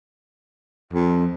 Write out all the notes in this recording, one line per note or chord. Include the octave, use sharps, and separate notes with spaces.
F2